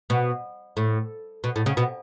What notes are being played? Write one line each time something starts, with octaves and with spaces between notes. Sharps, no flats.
B2
A2
B2
A2
C#3
B2